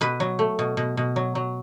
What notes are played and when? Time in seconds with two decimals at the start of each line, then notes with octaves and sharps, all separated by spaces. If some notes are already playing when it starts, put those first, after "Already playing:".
0.01 B2 B4
0.20 F#3
0.39 A3
0.59 B2
0.77 B2
0.97 B2
1.16 F#3
1.35 F#3